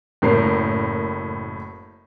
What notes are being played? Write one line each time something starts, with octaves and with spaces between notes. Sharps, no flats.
F#1 A2 A#4 C7